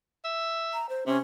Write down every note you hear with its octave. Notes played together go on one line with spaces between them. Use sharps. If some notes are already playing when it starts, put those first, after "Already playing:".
E5
A#5
C5
C3 C#4